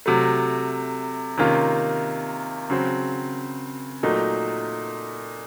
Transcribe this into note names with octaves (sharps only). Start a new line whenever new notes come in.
C3 F#3 A3
C3 D#3 A#3 C#4 F4
C#3 F#3 C4
A#2 F#3 A3 D#4